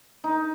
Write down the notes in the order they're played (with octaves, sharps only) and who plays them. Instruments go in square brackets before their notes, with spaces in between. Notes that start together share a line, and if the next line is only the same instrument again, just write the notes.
[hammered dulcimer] D#4